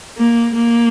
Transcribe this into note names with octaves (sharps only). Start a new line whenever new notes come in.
A#3
A#3